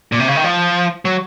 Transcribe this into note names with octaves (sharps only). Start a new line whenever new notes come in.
A#2
C3
C#3
D#3
F3
F#3